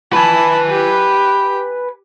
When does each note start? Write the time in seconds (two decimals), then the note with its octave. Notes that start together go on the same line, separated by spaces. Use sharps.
0.13 B4 G#5 A5 B5
0.69 G4